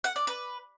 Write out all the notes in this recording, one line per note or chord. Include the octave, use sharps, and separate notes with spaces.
F#5
D5
B4